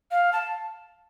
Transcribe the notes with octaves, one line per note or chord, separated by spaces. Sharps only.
F5
A5